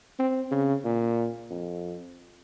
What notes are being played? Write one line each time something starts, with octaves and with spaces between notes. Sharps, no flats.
C4
C#3
A#2
F2